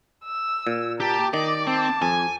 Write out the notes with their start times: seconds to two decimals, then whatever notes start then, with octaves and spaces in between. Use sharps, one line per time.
0.25 E6
0.67 A#2
1.00 G4 A5 A#5
1.34 D#3 D5 D#5 D6
1.67 C4 A5
2.02 F2 G#5